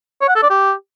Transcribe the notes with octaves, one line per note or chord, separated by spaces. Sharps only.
C#5
F#5
A4
D5
G4